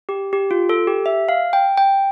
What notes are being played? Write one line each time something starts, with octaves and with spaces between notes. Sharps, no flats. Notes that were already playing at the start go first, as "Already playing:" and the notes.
G4
G4
F4
A4
G4
E5
F5
G5
G5